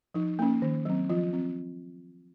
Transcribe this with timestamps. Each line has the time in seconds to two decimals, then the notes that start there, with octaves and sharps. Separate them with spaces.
0.14 F3 D#4
0.39 A#3 C#4
0.62 D#3
0.85 F#3 C4
1.09 F3 F4
1.33 C4